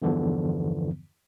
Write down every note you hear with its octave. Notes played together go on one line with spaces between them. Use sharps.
E2 G2 D3 E3 F3 B3